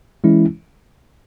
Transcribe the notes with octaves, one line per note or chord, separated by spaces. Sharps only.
E3 G#3 C#4 E4